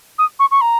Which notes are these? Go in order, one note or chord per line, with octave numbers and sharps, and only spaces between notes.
D#6
C#6
C#6
A#5